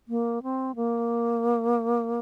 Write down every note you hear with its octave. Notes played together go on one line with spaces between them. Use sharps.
A#3
C4
A#3